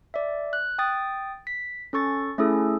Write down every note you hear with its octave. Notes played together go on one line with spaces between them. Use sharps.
D5 E5
F#6
G5 D#6 A6
B6
C#4 A4 C#6 A6
A3 C#4 E4 G#4 A4